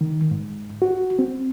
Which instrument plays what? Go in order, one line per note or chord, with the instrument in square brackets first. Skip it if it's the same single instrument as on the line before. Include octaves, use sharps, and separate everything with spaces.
[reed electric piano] D#3
G#2
F#4
C4